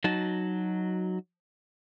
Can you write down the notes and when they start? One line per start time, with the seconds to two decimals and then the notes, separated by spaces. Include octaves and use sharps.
0.04 F#3 D#4 F#4 A5